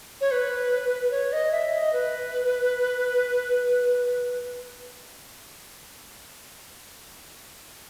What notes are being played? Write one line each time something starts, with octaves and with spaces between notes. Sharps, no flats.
C#5
B4
C#5
D#5
E5
D#5
B4